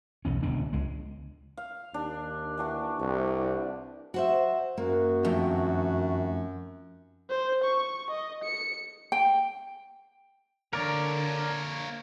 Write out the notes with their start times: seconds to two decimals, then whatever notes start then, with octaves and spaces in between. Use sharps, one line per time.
0.25 B1 E2 C#4
0.43 D1 C#2 B3 D4
0.73 C#2 G#3
1.57 F5
1.94 D#2 D4
2.58 E3 D4 F#4
2.99 C2 D5
4.14 F#4 C5 E5
4.77 F#2 A#3 F#4
5.25 F2 D#3 A3
7.29 C5
7.64 C#6
8.10 D#5
8.44 C#7
9.12 G5
10.73 D3 A#3 A#4 C#5 D5